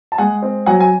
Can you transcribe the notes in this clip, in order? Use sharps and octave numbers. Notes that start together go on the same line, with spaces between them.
A5
G#3 F#5 G#5
C4
F#3 F#5 G#5
G#5